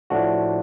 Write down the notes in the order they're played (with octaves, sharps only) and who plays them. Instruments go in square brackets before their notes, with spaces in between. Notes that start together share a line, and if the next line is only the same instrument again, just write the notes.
[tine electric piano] A2 F3 A3 D4 F#4